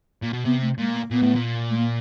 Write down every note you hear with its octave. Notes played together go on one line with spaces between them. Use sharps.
A#2
B2
C3 B3
A3
A#2 G#3
A#3
A#2 B3
A2
A#2
A3
A#3